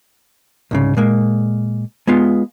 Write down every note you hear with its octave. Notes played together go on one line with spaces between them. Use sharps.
C2 G#2 C#3
A#2 G#3 A#3
G#3 B3 F4